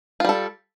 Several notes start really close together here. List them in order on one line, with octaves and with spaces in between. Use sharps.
F4 G3 A4